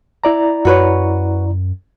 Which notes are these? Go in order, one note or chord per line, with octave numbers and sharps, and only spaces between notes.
E4 D5 A#5
F#2 F#4 B4 C#5